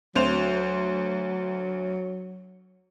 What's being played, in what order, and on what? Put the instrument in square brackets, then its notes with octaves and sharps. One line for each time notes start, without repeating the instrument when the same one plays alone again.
[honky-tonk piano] D2 C5 F7 [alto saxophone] F#3